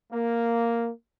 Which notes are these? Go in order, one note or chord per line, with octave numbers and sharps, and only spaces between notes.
A#3